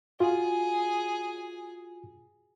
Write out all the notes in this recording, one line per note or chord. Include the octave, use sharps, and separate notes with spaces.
F4 F#4 G#4